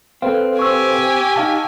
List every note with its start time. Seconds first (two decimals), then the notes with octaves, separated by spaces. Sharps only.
0.22 C4 A4 B4 F5
0.59 G4 G#5 C#6 E6
1.36 D#4 F5 A5